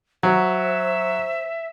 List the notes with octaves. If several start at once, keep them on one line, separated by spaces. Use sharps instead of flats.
F#3 C5 E5